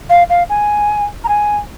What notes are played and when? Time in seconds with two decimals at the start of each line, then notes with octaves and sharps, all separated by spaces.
0.10 F5
0.30 F5
0.49 G#5
1.24 A#5
1.29 G#5